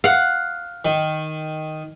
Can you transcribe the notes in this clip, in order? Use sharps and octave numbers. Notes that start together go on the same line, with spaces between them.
F5 F#5
D#3